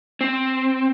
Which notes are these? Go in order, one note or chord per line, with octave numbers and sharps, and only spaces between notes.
C4